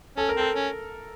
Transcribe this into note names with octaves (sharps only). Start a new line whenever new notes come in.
C#4 A4
A#4
C4 A4
C#4